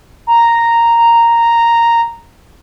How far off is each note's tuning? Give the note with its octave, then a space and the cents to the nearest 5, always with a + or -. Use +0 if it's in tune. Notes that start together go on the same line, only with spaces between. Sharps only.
A#5 -5